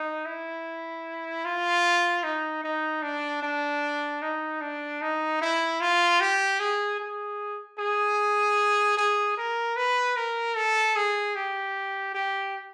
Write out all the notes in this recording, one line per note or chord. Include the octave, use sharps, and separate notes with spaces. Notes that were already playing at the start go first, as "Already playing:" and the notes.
Already playing: D#4
E4
F4
D#4
D#4
D4
D4
D#4
D4
D#4
E4
F4
G4
G#4
G#4
G#4
G#4
A#4
B4
A#4
A4
G#4
G4
G4